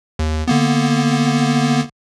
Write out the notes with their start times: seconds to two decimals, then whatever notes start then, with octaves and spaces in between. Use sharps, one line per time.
0.19 D#2
0.48 D3 A#3 B3